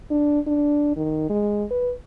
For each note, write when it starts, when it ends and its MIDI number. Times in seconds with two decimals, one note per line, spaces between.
0.10 0.40 62
0.47 0.93 62
0.97 1.29 51
1.30 1.64 56
1.71 1.92 71